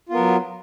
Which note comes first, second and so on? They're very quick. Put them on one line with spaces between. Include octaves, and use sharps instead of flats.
F4 B3 A#4 F#3